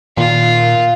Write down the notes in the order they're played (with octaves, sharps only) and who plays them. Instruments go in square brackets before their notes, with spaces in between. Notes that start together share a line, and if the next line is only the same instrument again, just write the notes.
[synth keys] A#2 [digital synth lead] D#3 [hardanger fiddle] F4